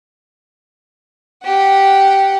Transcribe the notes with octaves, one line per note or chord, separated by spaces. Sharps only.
G4 F#5